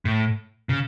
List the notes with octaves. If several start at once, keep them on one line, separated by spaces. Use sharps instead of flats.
A2
C#3